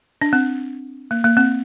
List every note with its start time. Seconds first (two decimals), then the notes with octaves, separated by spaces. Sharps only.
0.22 D4
0.33 C4
1.11 A#3
1.24 A#3
1.37 C4